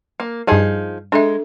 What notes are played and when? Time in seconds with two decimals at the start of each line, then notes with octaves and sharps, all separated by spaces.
0.20 A#3
0.47 G2 F3 G3 D#4 G#4
1.12 G#3 D4 A4 E5